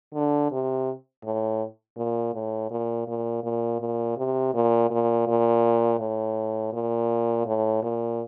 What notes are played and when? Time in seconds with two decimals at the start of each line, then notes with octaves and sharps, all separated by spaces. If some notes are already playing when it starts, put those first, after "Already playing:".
0.14 D3
0.52 C3
1.25 A2
1.97 A#2
2.34 A2
2.71 A#2
3.08 A#2
3.44 A#2
3.80 A#2
4.17 C3
4.54 A#2
4.91 A#2
5.27 A#2
5.99 A2
6.73 A#2
7.46 A2
7.83 A#2